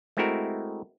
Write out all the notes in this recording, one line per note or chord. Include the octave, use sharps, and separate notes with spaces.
G#3 A3 C4 E4 F#4 A#4